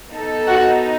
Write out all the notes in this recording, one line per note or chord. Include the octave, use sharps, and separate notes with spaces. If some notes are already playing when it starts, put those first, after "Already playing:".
B3 D#4 A4
F#4 F#5